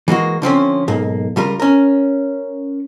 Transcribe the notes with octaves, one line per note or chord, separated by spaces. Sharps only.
E3 G#3 A#3 F#4
D3 F3 C4 C#4
B1 G#2 A#3
C#2 G3 F4 A#4
C#4 A#4